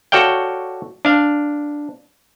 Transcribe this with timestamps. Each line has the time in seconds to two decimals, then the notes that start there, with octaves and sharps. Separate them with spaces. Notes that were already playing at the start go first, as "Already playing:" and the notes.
0.12 F#4 A4 C#5 D5 F5 G5
1.05 D4 F5